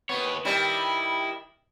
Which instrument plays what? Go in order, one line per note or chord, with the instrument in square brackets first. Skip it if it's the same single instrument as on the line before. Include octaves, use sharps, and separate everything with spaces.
[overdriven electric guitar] D#2 C#5 [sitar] B3
[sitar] D#3 G3 [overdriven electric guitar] E4